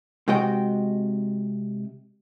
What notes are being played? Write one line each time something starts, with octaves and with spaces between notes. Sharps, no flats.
C3 G#3 F#4 D#5 G5